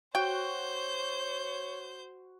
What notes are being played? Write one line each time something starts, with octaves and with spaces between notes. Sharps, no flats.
F#4 C5 C#5 G5 G6